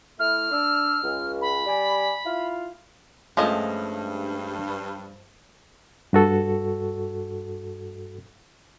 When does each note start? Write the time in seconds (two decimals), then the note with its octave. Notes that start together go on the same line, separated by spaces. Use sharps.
0.19 A3 E4 F6
0.51 D4 E6
1.03 C#2
1.41 B5
1.66 G3 D5 G#5
2.25 E4 F4 F5
3.37 G2 F3 G#3 A3 C#4 D#5
6.13 G2 F#4 A4